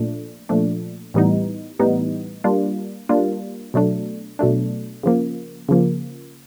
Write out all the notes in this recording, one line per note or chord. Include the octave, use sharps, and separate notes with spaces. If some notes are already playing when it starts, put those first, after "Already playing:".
Already playing: A#2 F3 A3 D4
A#2 F3 A3 D4
A2 E3 G3 B3 D#4
A2 E3 G3 B3 D#4
G3 A#3 D4 F4
G3 A#3 D4 F4
B2 F#3 A3 D4
B2 F#3 A3 D4
C#3 F3 A#3
C#3 F3 A#3